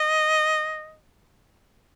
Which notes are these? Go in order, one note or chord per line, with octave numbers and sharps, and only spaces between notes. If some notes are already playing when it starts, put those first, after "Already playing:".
Already playing: D#5